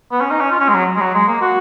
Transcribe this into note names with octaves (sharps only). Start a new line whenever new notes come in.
B3
C#4
D#4
C#4
F4
C#4
G#3
F#3
G#3
F#3
G#3
A#3
F#4